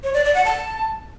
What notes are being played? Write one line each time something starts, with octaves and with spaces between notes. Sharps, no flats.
C#5
D5
D5
F#5
A5